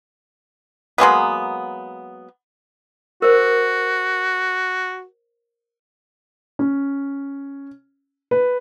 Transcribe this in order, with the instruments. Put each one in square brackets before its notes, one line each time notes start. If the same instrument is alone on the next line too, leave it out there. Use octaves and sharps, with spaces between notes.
[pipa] F#3 G#3 A#3 B3
[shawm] F#4 [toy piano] A#4 C5
[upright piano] C#4
B4